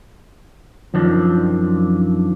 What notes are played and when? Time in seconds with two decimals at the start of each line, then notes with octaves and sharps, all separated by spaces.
0.94 F#2 D#3 F3 D4